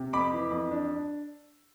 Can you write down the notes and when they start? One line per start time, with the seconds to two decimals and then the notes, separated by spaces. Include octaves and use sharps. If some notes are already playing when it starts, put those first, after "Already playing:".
Already playing: C3
0.13 F2 B5 D6
0.33 E3
0.51 F2
0.71 D4
0.91 D4